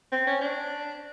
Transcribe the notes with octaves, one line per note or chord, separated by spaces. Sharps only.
C4
C#4
D4